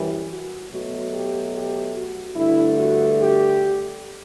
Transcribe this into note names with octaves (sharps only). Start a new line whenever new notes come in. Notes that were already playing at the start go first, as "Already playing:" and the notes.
Already playing: F#2 E3 G3
F#4
B2 F#3 A3 F#4
G4
G4
F#4
G2 D3 A3 E4
F#4
G4